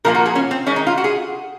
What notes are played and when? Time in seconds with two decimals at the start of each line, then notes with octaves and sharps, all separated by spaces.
0.04 A#2 F3 A#3 A#4
0.15 F#4
0.26 G#4
0.35 C#4
0.51 C4
0.66 D#3 G#3 C#4
0.76 D#4
0.87 F4
0.98 F#4
1.04 G#4